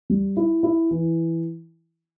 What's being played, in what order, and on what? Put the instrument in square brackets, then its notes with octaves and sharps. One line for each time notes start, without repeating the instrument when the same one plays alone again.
[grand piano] G3
E4
E4
E3